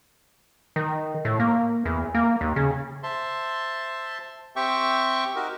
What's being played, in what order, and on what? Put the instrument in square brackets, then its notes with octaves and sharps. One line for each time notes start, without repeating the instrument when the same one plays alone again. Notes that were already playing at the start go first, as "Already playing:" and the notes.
[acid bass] D#3
A2
A#3
E2
A#3
D#2
C#3
[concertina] C5 E5 A5 C6
C4 G4 E5 G5 C#6
D#4 F#4 G4 A#4